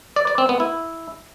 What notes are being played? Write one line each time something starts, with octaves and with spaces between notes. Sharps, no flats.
D5
D5
C4
B3
E4